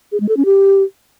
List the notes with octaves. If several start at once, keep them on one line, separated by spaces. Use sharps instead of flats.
G#4
G#3
A4
C#4
G4